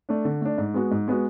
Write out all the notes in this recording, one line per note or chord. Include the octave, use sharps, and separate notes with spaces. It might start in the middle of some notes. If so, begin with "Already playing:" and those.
A3 D4
D3
A3 D4
G#2
G#3 B3 F#4
G#2
G#3 B3 F#4